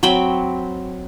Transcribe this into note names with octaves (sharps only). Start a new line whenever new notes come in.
F#3 C4 G5 B5